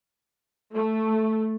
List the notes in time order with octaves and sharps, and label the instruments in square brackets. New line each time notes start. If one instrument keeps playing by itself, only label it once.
[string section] A3